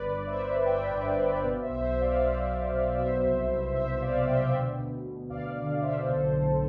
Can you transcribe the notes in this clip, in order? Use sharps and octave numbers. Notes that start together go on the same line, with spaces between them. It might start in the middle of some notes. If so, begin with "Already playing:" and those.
Already playing: G1 B4 D5
G1
C5 E5
G1
G1 E5 G5
G2
G1
B2 D5 F5
C5 E5
B1
C5 E5
B2
D5 F5
B1 C5 E5
B2
B1
B2 C5 E5
C2
B2
B2 C5 E5
B2 D5 F5
B2 E5 G5
D2
D2
D2
D2 D5 F5
D3
D2 C5 E5
B1 A4 C5
A2